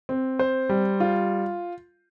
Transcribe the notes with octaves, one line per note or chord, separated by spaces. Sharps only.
C4
C5
G3
F4